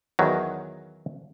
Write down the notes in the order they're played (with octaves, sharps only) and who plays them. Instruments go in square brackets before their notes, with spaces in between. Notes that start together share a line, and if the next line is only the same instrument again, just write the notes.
[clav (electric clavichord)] E2 D#3 F#3